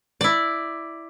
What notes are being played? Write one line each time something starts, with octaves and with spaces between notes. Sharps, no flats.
E4 D5